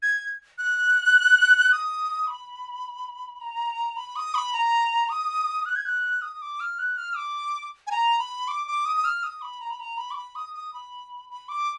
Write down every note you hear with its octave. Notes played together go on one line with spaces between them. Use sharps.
G#6
F#6
D#6
B5
A#5
B5
D#6
B5
A#5
D#6
F#6
G#6
F#6
D#6
D6
F6
F#6
F6
D6
G#5
A#5
B5
D6
D6
D#6
D#6
F6
D#6
B5
A#5
B5
A#5
B5
D6
B5
D#6
D#6
B5
B5
D6